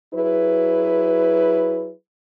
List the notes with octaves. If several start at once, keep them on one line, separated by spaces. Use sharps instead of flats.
F#3 E4 G#4 B4